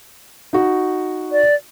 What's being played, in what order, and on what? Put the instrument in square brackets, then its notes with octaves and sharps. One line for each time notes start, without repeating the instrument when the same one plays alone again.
[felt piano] D#4 F#4
[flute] D5